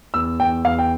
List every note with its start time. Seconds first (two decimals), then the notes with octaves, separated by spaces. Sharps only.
0.14 E2 E6
0.40 E2 G5
0.64 E2 F5
0.79 G5